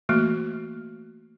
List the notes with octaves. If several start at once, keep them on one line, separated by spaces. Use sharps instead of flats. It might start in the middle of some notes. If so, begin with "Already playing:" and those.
E3 A3 A#3 F#4